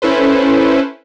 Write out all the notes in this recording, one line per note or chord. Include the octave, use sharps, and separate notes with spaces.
C#4 E4 A4 B4 C5